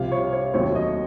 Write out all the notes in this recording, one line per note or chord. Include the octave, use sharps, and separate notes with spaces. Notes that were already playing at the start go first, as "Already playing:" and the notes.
Already playing: C2 C3 F3 F5
C#5
C#5
F1 D#2 D#3 F#3 C4 C#5
D#5